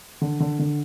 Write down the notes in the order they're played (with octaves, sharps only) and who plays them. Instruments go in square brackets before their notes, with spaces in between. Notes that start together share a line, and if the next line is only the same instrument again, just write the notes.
[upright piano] D3
D3
D3